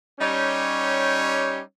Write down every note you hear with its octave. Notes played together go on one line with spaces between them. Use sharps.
G3 C#4 D#4 G4 C#5